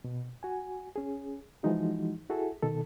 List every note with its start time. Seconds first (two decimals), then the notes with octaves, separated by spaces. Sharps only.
0.04 B2
0.43 F#4 G#5
0.96 C#4 G#4
1.63 E3 F3 G#3 D#4 F#4
2.30 E4 F#4 G#4 A4
2.62 B2 D#3 A4